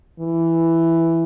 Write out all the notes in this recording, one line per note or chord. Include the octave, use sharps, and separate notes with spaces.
E3